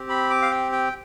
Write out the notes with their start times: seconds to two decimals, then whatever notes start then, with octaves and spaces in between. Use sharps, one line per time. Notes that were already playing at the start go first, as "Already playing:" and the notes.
Already playing: C4 G4
0.09 B5
0.30 D6
0.42 F5
0.51 G5
0.72 G5